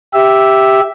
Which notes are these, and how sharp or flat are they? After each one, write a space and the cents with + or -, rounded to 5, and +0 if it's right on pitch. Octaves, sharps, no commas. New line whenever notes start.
G4 +0 E5 +0